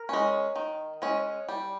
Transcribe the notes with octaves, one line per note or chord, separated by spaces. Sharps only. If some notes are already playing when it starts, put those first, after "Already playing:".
Already playing: A#4
G#3 C#4
D#3
G#3 C#4
G3